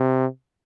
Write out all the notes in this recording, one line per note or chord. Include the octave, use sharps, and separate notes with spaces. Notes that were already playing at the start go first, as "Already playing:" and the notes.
Already playing: C3